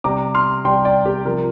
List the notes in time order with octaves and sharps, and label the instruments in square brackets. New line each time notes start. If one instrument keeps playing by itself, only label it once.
[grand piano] C3 G3 A#5 D6
C6 F6
C3 G3 G5 C6
D5 G5
G4
C3 F3 A#4